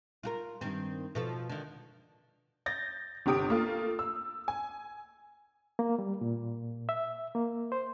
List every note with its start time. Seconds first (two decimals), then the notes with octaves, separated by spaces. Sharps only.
0.23 F4 F#4 A#4
0.61 G2 D#3 C4
1.15 B2 F3 A4
1.49 D3 D#3
2.66 G6 A6 A#6
3.26 G1 C3 G4 D#6 D7
3.49 A3 A#3 F4
3.99 E6
4.48 G#5
5.79 A#3
5.99 G3
6.21 A#2
6.89 E5
7.35 A#3
7.72 C5